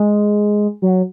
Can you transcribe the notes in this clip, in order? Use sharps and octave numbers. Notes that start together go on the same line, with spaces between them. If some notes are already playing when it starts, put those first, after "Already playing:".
Already playing: G#3
F#3